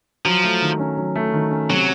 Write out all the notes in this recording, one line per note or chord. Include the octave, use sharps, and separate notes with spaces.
F3 F#3
A3
D#3
C#4
F#3
A3
D#3
C#4
C3 F#3